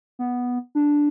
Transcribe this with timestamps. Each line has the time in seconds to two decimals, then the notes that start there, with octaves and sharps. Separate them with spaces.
0.19 B3
0.75 D4